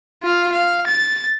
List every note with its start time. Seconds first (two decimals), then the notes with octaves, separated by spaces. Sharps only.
0.23 F4 F5
0.52 F5
0.87 A6